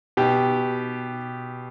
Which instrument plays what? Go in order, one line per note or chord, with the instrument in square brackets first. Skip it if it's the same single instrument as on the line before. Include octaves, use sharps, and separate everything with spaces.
[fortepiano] B2 G4